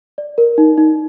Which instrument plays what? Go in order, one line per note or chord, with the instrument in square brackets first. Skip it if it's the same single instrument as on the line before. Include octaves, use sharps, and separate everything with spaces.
[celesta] D5
A#4
D#4
D#4